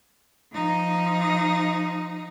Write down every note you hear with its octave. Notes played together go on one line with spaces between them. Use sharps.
F3 D#4